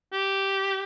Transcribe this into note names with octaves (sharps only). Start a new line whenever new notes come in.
G4